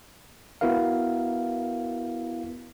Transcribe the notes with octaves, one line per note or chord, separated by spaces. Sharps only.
B3 E4 F#4 A#4 F5